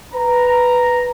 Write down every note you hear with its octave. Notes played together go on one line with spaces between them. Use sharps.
B4 A#5